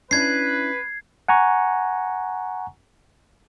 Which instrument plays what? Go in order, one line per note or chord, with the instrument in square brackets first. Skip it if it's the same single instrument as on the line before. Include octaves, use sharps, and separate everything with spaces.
[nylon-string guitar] C#4 D4 E4 [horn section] B4 [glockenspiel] G#6 C7
[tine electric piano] F#5 G#5 A#5 C#6